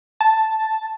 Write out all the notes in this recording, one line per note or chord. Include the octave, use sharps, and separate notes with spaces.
A5